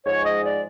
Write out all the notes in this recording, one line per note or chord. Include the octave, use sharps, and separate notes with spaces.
G#2 F3 G#3 C#5
D#5
D5